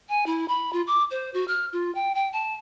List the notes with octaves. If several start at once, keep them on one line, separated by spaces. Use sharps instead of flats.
G#5
E4
B5
F4
D6
C5
F#4
F6
F4
G5
G5
A5